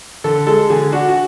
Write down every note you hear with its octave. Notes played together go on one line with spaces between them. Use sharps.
D3 A4
G#3 A4
D3 G#4
D4 F#4
F#4